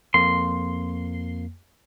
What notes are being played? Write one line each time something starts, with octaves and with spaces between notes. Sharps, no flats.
F2 A#3 C6